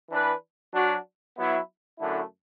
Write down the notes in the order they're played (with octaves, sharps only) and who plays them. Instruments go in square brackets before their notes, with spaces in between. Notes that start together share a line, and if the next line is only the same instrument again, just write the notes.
[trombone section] E3 D4 B4
F#3 D4 F#4
F#3 B3 E4
F#2 D3 A3 E4